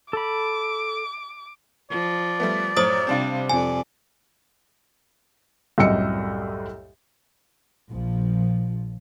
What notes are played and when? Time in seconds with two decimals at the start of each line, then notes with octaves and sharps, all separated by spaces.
0.13 A4 B5 D6
1.91 F3 D5
2.40 G3 A3 B3
2.77 F#2 A2 C5 D#6
3.07 C3 G3 C4 D4 F4
3.50 F2 D5 G#5
5.78 C2 F#2 A2 D#5 E6 C#7
7.90 A#1 F3